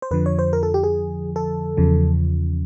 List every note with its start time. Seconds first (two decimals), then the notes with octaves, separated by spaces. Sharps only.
0.02 C5
0.11 F2 D3 F3 B4
0.26 C#5
0.39 C5
0.53 A#4
0.63 A4
0.74 G4
0.84 G#4
1.36 A4
1.77 E2 C#3 F3